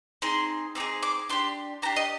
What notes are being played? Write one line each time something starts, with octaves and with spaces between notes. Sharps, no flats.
C4 D#4 G#4 C6
C4 D#4 G#4 D6
D6
D4 G4 C6
D4 G4 A#5
D#5